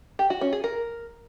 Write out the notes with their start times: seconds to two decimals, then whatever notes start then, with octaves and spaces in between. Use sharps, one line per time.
0.19 G4
0.30 F#4
0.41 C#4
0.53 G#4
0.64 A#4